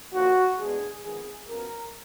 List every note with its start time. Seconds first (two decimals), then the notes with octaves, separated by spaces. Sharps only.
0.13 D#2 D3 F3 A#3 F#4
0.58 D2 D3 G#3 B3 G#4
1.03 F2 D#3 G#3 B3 G#4
1.47 F#2 F3 B3 A#4